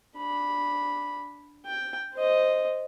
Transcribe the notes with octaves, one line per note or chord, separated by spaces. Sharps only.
D4 B5
G5
C5 D#5